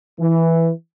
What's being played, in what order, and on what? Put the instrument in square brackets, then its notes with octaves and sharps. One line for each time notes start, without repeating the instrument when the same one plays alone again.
[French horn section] E3